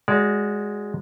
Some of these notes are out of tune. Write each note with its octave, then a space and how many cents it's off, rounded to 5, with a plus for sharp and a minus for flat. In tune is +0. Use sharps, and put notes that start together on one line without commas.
G#3 -5 F#4 +0 D5 -25